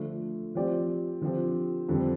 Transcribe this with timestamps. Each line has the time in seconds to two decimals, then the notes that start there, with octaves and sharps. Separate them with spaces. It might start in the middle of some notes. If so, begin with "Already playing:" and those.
Already playing: D3 F3 A3
0.55 F3 C4 G4 D5
1.21 D3 F3 C4 G4
1.89 F2 D3 G3 C4